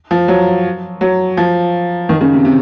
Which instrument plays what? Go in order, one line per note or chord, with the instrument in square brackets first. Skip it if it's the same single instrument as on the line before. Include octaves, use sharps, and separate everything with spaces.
[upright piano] F3
F#3
F#3
F3
D#3
C#3
C3
C3